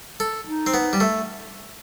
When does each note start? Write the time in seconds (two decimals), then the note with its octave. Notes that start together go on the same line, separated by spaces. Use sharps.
0.20 A4
0.46 D#4
0.67 C4
0.74 B3
0.93 G3
1.00 A3